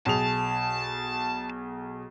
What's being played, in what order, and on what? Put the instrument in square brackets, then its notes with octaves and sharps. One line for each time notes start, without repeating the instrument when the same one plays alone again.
[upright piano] B1 G#4 F7 [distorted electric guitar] A5